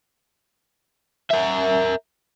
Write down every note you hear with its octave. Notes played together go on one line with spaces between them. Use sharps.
A#4 E5